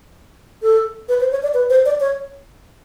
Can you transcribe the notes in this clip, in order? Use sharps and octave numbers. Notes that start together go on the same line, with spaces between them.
A4
B4
C5
C#5
D5
B4
C5
D5
C#5